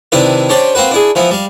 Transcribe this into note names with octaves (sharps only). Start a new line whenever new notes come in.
C3 D#3 D4 E4 B4
C#4 D4 G4 C5 D5
A#3 C4 F#4 B4
D4 E4 G#4
E3 F3 B3 E4
G3 F5